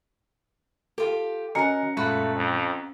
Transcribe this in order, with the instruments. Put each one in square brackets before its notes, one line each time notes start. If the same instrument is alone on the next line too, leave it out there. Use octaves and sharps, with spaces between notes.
[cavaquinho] F4 G4 [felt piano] A4
[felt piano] C#4 A#5 C#7 [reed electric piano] F#4 D#5 G#5 [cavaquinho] A#4 F#5
[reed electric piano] F#2 A#2 G#3 [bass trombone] A3 [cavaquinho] F4 F#4 B4
[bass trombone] F2